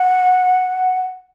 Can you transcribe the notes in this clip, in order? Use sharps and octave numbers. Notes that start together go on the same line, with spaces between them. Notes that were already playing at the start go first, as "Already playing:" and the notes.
Already playing: F#5